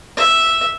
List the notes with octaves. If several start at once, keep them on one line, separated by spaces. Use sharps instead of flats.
E5